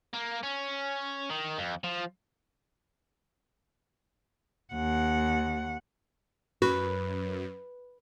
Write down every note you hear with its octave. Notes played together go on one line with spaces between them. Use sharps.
A#3
C#4
D#3
F2
F3
D#2 F#5
F#2 F#4 B4